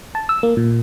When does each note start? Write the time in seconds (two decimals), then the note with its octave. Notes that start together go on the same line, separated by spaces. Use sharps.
0.15 A5
0.29 E6
0.43 A#3
0.57 A#2